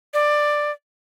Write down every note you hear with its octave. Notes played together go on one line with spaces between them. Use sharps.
D5